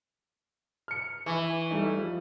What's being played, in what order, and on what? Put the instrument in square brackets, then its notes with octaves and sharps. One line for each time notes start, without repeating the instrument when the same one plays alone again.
[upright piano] F6 C#7
[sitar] E3 [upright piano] C#6
[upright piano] G3 A3 D#4
F3